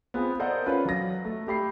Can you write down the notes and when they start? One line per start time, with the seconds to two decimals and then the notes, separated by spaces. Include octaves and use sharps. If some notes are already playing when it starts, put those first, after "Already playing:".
0.14 B3 C4 F4 G#4 B4
0.39 A4 A#4 C5 D5 D#5 F#5
0.66 C#4 F4 B4
0.85 F#3 A#6
1.25 A3
1.47 A3 G4 B5 C7